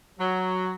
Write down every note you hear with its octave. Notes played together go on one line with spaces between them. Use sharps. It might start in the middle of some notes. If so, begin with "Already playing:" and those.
F#3